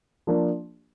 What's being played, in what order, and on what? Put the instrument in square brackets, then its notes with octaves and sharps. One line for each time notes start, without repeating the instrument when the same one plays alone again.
[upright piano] F3 A#3 D4